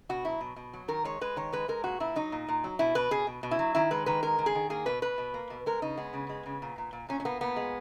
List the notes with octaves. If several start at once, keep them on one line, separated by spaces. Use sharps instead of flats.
B2 F#4
F#3 E4
B2
B2
F#3
D#3 A#4
G#3 C#5
G#3 B4
D#3 C#5
G#3 B4
G#3 A#4
A#2 F#4
A#2 E4
F#3 D#4
A#2
A#2
F#3
B2 E4
B2 B4
B2 G#4
B2
B2
E4
F#3
D#3 E4
G#3 B4
D#3 B4
G#3 A#4
D#3
G#4
D#3
A#3 G#4
B2 B4
B2 B4
B2
A#3
B2
G#3 A#4
C#3 D#4
G#3 B3
C#3
G#3
C#3
A#2
A#2
A#2
A#2 C#4
C#4
A#3 B3
A#2 B3
G#3